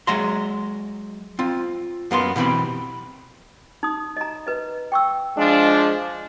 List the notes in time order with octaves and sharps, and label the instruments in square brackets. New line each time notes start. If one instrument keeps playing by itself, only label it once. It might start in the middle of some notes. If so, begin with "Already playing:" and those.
[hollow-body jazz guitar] F#3 G#3 E5 A#5 C6
C4 F4
F#2 A#3 B3 C6
B2 E3 C4 G4 B5
[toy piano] D#4 D#6
D#5 A#5
B4 D#5
G5 C#6 E6
[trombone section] F3 G#3 D4